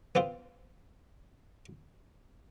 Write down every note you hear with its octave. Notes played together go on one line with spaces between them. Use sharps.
B3 C4 F4 C5